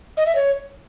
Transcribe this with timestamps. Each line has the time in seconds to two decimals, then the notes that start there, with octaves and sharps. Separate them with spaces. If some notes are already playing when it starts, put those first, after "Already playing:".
0.17 D#5
0.26 E5
0.35 C#5